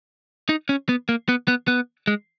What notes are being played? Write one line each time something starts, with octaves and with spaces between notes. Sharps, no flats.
D#4
C#4
B3
A#3
B3
B3
B3
G#3